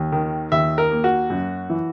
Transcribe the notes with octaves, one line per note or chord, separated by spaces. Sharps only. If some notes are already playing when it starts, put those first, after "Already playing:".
Already playing: D#2
D#3
D#2 E5
A#4
A#3
F#4
F#2
E3